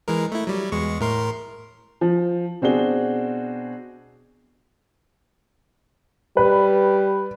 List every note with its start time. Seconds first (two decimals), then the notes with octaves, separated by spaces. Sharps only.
0.08 E3 G#3 A#4
0.32 A3 E4
0.47 F#3 G3
0.72 E2 G#3 C#6
1.01 A2 A#4 C6
2.01 F3
2.62 B2 C4 D4 F#4 G#4 G7
6.37 G3 B4